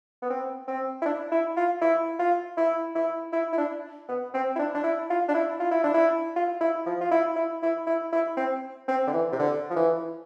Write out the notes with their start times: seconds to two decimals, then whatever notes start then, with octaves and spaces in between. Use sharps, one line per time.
0.22 B3
0.30 C4
0.68 C4
1.02 E4
1.06 D4
1.32 E4
1.57 F4
1.82 E4
2.19 F4
2.57 E4
2.95 E4
3.33 E4
3.53 E4
3.58 D4
4.09 B3
4.34 C4
4.56 E4
4.59 D4
4.75 D4
4.84 E4
5.10 F4
5.29 D4
5.34 E4
5.60 F4
5.71 E4
5.84 D4
5.94 E4
6.36 F4
6.61 E4
6.86 F3
7.01 F4
7.11 E4
7.36 E4
7.62 E4
7.87 E4
8.13 E4
8.37 C4
8.88 C4
9.07 D3
9.13 E3
9.33 C3
9.39 D3
9.70 F3
9.76 E3